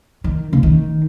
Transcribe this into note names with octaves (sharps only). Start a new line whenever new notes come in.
D#3
C#3
D#3